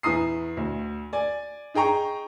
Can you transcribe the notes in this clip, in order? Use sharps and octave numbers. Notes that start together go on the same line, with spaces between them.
E2 E4 A#5 D#6 C7
D2
D5 G#5
D#4 G#4 G5 A#5 C#6